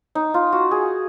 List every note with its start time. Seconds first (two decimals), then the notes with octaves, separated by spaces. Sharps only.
0.15 D#4
0.34 F4
0.52 F#4
0.71 G#4